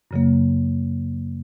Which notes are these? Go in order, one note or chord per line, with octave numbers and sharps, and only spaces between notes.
F#2 C#3 F#3 A#3